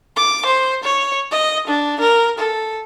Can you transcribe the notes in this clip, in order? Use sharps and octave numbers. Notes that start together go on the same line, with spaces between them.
D6
C5
C#5
D#5
D4
A#4
A4